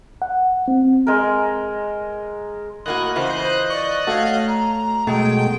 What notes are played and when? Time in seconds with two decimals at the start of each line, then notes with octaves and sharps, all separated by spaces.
0.22 F#5
0.68 C4
1.07 G#3 A#4
2.86 A2 A#3 F#4 A#4 D#5 F#6
3.16 C#3 E3 F4 C5
3.70 D5 C#6
4.07 A3 F#4 C#5 F5
4.48 A#5
5.07 B2 F#3 G#3 A3 D#5 G5